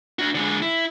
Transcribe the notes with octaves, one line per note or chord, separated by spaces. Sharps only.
D4 F#4
D3 G#3
E4